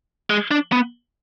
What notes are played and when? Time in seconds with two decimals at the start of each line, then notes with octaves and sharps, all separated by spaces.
0.30 G#3
0.51 D4
0.72 B3